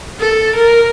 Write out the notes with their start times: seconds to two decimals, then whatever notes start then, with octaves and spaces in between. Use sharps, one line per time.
0.20 A4
0.55 A#4